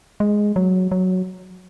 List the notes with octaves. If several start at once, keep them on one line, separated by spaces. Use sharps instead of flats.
G#3
F#3
F#3